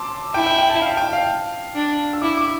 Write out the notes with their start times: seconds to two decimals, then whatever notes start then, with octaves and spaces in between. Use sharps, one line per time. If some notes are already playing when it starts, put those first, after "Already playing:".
Already playing: A5 C6 D6 E6
0.34 E4 G5
0.46 G5
0.58 G5
0.70 A5
0.82 F5
0.97 G5
1.13 F5
1.75 D4
2.13 E6
2.22 E4 D6
2.37 D6